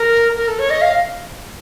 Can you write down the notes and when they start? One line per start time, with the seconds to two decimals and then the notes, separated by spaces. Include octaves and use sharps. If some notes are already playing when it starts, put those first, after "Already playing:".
Already playing: A#4
0.36 A#4
0.48 A4
0.59 C#5
0.70 D#5
0.81 F5